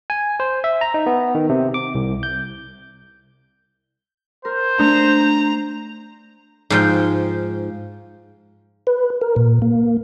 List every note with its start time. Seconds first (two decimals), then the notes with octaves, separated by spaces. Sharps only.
0.10 G#5
0.40 C5
0.64 E5
0.81 A#5
0.94 D#4
1.06 B3
1.35 D#3
1.49 C3
1.74 D6
1.95 C2
2.23 G6
4.45 A#4 C5
4.80 A3 D4 A#5
6.70 G#2 F3 G5
8.87 B4
9.21 A#4
9.36 A#2
9.62 A#3